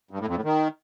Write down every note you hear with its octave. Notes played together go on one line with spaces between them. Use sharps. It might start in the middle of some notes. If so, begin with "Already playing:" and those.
G2
A2
F2
A2
D#3